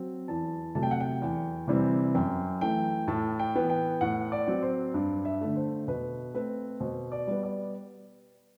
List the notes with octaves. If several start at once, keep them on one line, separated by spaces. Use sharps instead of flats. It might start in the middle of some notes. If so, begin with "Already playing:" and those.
Already playing: F#3 C4
E2 A5
C3 F#3 A3 A5
G5
F#5
G5
E2
C3 E3 G3 C4
F#2 G5
E3 A3 G5
A2 A5
G5
E3 B3
G5
A2 F#5
D5
F#3 C4
C5
G2
E5
D3 A3
C5
B2 B4
A3 C4 B4
B2 C5
D5
G3 B3
D5